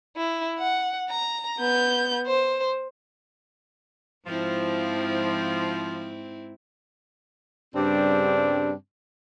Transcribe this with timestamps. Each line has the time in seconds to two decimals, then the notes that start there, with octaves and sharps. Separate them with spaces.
0.17 E4
0.58 F#5
1.09 A#5
1.58 B3 G6
2.27 C5
4.27 G#2 F3 C4 E4
7.75 G2 C#3 G3 C4 D4